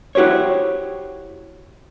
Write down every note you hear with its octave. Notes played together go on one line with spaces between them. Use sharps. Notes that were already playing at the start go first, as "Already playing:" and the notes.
E4 F#4 G4 C5 C#5